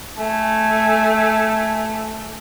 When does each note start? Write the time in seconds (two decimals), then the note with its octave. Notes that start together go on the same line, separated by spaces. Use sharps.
0.18 A3 G#5